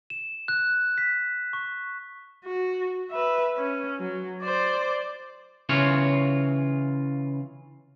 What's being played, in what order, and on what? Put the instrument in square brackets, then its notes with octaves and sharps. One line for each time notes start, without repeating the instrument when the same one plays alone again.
[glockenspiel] E7
F#6
B6
C#6
[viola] F#4
B4 E5
C#4
F#3
C5 D5
[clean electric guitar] C#3 E3 F4 C#5